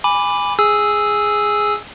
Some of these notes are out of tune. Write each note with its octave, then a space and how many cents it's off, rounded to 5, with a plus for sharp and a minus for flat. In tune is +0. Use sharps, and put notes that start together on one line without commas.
G#5 -15 B5 +5 D6 +0
G#4 +0 G#5 +0 E6 +0